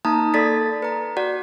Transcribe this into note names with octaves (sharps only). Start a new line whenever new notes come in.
A#3 D#4 A5 A#5 D#6
A#3 A4 D5 A6 B6
B4 A#5
F#4 D5 F#5